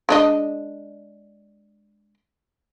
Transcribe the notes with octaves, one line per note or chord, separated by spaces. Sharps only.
G#3 D4 D#5